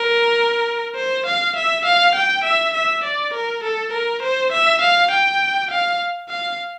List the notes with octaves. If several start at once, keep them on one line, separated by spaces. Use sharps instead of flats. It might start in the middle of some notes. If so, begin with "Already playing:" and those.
Already playing: A#4
C5
F5
E5
F5
G5
E5
E5
D5
A#4
A4
A#4
C5
E5
F5
G5
F5
F5